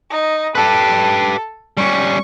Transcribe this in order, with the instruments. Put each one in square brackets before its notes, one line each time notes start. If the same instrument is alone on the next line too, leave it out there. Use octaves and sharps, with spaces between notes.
[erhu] D#4
[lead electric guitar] G4 B4 [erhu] A4
[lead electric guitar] G3 C#4 [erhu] C#6